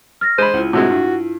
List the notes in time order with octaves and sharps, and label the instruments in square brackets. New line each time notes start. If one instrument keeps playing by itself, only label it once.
[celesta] F6 A6 A#6
[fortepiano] G#3 B5 [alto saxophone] C5 [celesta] D#7
[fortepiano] C#2 [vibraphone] E4 F4
[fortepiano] A2 C3 G#3 [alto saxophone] F#4
[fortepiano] G2